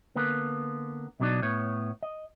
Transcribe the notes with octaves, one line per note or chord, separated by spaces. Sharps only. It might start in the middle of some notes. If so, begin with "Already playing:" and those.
D3 A#3 B3 B4
B1 B2 F#3 A3 D4 D#4
A2 B3 C#5
D#5